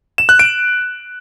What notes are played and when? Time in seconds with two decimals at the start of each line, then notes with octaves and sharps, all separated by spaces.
0.18 E7
0.29 F#6
0.39 D7